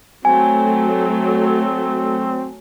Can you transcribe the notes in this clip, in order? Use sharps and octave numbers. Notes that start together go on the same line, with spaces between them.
F#3 A3 C4 G#5